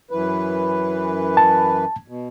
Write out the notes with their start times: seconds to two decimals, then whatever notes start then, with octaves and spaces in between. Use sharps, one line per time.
0.11 F#2 E3 B4
1.37 A5
2.08 B2